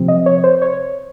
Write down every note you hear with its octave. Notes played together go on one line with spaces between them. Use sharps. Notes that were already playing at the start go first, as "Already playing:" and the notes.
Already playing: C3 F3 C4
D#5
C#5
C5
C#5